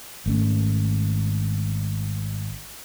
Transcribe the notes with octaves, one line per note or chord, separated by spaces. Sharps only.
G#1 A3 C#4